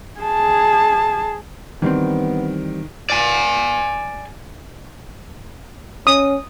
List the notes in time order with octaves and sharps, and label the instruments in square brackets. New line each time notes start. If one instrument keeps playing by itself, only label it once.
[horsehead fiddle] G#4 A5
[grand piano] D#3 [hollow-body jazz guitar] E3 G3 C4 [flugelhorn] B3
[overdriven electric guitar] D5 G#5
[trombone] C#4 [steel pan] D#6